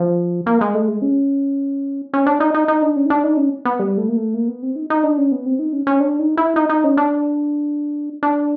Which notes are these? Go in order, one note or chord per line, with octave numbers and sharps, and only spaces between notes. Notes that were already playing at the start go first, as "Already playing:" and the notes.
Already playing: F3
A#3
G#3
A3
G#3
C#4
C#4
D4
D#4
D#4
D#4
D4
C#4
D#4
D4
D#4
C#4
B3
G3
A3
A#3
A3
A#3
B3
C4
D#4
D#4
D4
C#4
B3
C4
D#4
C#4
C#4
D4
D#4
E4
D#4
D#4
C#4
D4
D4